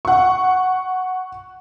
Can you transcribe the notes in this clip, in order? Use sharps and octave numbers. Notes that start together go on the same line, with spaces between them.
F#5 C#6